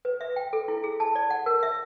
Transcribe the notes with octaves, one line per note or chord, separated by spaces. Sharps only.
B4
E5
G5
A4
E4
G#4
A5
D5
F#5
A#4
E5